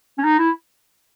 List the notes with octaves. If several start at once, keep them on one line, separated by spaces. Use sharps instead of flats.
C#4
D#4
E4